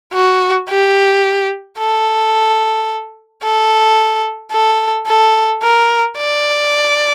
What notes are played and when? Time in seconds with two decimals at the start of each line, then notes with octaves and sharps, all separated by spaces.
0.13 F#4
0.69 G4
1.78 A4
3.43 A4
4.52 A4
5.07 A4
5.63 A#4
6.17 D5